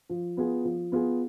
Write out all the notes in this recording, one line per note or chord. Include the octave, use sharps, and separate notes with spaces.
F3
B3 F4 G#4
F3
B3 F4 G#4